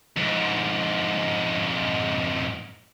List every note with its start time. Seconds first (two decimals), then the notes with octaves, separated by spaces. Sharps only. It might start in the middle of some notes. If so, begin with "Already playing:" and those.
0.16 F2 G#2